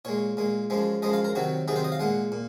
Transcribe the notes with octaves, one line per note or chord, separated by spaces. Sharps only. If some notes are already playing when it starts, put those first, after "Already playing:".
A#2 G#3 C#5
A#2 G#3
F#2 F3 G#3
F#2 F3 G#3 D#5
F5
A#4
C3 D#3 F#3 F#4
C3 D#3 F#3 G#4
C5
D#5
F5
A#2 G#3 F#5
A#2